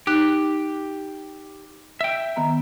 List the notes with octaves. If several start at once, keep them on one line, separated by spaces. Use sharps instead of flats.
D#4 G4 F#6
E5 G5
D#3 B3 A#5